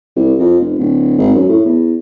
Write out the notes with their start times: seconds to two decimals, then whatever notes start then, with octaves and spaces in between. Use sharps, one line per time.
0.16 C2
0.39 F2
0.60 F1
0.79 D1
1.18 G#1
1.35 F#2
1.49 A2
1.66 E2